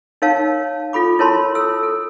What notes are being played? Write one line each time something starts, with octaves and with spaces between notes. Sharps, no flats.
D#4 A#4 C#5 F5 A5
F4 A4 B5 D6
E4 A#4 C#5 A5 B5 C6
A4 E6
A4